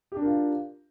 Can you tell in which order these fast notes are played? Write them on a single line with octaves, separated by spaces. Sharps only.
G4 D4 A#4 F4